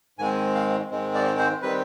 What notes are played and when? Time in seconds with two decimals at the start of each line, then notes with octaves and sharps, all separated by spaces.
0.19 G#2 D#3 G#3 C4 G#5
0.55 F5
0.91 G#2 D#3 G#3 C4
1.15 D5
1.39 C5
1.62 D#3 G3 C4 B4